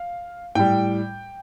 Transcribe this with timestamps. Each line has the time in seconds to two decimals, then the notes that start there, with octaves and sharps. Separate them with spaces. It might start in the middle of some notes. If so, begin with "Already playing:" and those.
Already playing: F5
0.55 A2 G3 G5